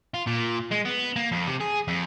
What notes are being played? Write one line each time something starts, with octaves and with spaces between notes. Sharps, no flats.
F4
A#2
G#3
B3
A#3
F2
C3
G#4
F2